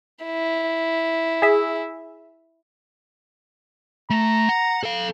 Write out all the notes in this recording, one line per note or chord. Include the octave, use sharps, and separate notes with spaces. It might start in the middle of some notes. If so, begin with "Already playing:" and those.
E4
G#4 E5
A3 A#5
F#5
A4 F5